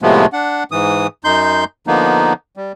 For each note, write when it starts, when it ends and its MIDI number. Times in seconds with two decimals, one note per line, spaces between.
0.02 0.26 45
0.02 0.26 48
0.02 0.26 53
0.02 0.26 56
0.02 0.26 57
0.02 0.26 59
0.33 0.64 62
0.33 0.64 78
0.71 1.07 44
0.71 1.07 52
0.71 1.07 87
1.24 1.64 42
1.24 1.64 63
1.24 1.64 84
1.24 1.64 91
1.87 2.33 50
1.87 2.33 53
1.87 2.33 58
1.87 2.33 59
1.87 2.33 63
2.57 2.72 55